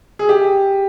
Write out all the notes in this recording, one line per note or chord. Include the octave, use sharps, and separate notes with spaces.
G#4
G4